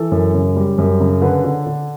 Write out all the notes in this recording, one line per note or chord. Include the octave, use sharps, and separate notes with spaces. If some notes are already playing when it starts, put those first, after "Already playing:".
Already playing: E3 A4
F#2
C#3
G3
F#2
C#3
D3 B4
D3
D3